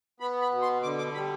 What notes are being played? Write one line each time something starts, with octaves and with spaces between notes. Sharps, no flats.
B3 B5
B5
B2
C6
D3 D6
D6
G3 B5